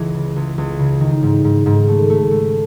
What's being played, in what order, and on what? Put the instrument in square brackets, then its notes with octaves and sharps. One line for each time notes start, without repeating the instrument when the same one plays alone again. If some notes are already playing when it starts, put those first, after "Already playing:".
Already playing: [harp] C#2 E3
C#3
C#2
C#2
C#3
D#3
G#2
G#2
G#2
A3
A3
A3